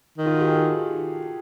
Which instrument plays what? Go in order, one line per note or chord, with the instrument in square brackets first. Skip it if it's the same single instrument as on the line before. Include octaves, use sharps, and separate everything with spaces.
[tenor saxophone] D#3
[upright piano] F4
F#4
G4
G#4
A4